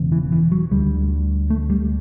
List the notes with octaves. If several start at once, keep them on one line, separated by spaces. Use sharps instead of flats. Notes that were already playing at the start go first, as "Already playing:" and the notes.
Already playing: E1 E2 C#3
E3
E3
F#3
D2 D3 G3
A3
G3